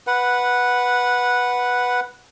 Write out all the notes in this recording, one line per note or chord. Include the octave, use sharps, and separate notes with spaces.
B4 F#5